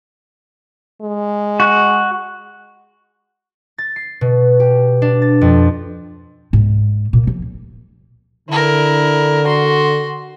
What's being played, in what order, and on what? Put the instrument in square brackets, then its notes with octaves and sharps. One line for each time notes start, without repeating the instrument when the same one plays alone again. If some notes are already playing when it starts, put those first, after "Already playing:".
[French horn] G#3
[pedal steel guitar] F#4 F#6
[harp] A6
C7
B2
G4
D4
A6
F2
[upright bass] G#2
A#2
F3
[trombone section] D3 [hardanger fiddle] E4 A#4
[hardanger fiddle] F#4 C6